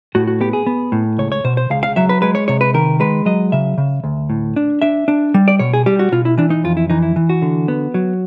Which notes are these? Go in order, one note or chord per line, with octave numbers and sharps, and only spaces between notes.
A2 F#4
F#4
B3 G4
G#4
B3
A2
C#2 C#5
C#5
B2 C5
C5
C#2 F5
F5
F#3 E5
B4
G#3 B4
C#5
C3 C#5
B4
D#3 A#4
G#3 B4
F#3 D#5
C#3 E5
C#3
D2
A2
D4
D4 E5
D4
G3
D5
B2 C#5
G#4
G3 G4
F#4
B2 F4
E4
E3 D4
D#4
F2 F4
E4
E3 D#4
E4
E3
F#4
D3
B3
F#3